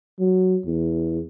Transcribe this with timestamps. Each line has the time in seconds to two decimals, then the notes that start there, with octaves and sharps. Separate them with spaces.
0.19 F#3
0.65 E2